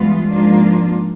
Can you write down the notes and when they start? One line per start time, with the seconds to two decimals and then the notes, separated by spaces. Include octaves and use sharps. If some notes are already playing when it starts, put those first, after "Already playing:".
Already playing: G2 E3 G#3 B3 F4
0.31 G#2 F3 A#3 D4 F4